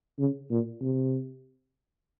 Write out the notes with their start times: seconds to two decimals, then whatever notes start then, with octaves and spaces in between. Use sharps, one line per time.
0.19 C#3
0.51 A#2
0.81 C3